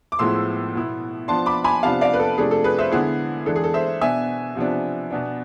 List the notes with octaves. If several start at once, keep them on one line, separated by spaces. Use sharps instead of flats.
D6
A2 F3 G#3 B3 E4 C6 E6
B2 B3 E4
F3 B3 D4 A5 C6
B5 D6
G#5 B5
C3 F3 B3 D4 F5 A5
D5 F5
B4
A4
C3 F3 A3 D4 G#4
A4
G#4 B4
C5 E5
D3 G#3 B3 E4 G#4
E3 G#3 D4 A4
G#4
A4
C5 E5
B2 B3 D4 E5 G#5
C3 F3 B3 D4
B2 B3 D4